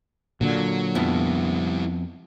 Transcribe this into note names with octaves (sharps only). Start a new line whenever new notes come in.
A#2 D3 F#3
F2 G3 B3 E4